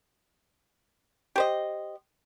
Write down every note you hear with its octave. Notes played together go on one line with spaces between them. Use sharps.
G4 C5 D#5